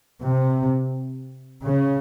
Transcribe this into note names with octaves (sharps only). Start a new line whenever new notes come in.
C3
C#3